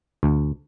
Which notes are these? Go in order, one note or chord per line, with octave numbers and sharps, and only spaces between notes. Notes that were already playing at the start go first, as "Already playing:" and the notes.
D2